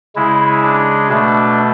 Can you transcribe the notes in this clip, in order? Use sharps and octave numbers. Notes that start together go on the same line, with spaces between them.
C#3 G#3 E4
D4
B2 A3 D4